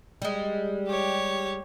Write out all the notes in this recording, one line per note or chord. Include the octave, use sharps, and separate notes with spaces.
G3 G#3
G4 C#5